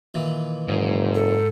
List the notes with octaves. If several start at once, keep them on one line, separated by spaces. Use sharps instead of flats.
A#2 D#3 E3
F#1 G#2
A4